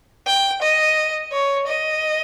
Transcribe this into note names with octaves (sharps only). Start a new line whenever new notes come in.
G5
D#5
C#5
D#5